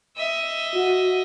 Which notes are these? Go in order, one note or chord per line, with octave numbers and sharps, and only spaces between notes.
D#5 E5
F#4